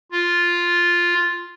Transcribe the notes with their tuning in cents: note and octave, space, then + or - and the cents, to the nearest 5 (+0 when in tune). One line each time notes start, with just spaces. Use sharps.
F4 +0